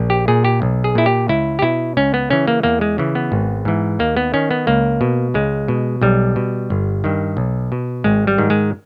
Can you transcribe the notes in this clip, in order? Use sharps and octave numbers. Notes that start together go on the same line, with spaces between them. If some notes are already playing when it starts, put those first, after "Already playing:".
Already playing: A#1
G4
A#2 G#4
G4
B1
G#4
A#2 E4
G4
C#2 E4
G4
B2 E4
C#2 C#4
B3
C#3 E3 C#4
A#3
E2 A#3
G#3
C#3 E3
B3
G#1
G#2 E3
D#2 A#3
B3
D#3 C#4
B3
C#2 A#3
B2
C#2 G#3
B2
B1 G3
B2
G1
G2 D#3
B1
B2
G#1 G#3
G3
G#2 D#3
G#3